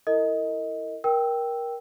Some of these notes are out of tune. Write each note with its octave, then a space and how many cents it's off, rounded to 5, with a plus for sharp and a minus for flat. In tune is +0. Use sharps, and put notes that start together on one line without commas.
E4 +0 A#4 -40 D#5 +15
A#4 +20 G5 +0 E6 +0